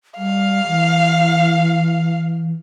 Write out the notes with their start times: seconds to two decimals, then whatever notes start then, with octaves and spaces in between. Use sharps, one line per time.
0.17 G3 F5
0.68 E3